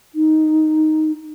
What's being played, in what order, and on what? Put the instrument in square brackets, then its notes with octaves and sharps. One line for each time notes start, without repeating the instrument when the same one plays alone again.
[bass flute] D#4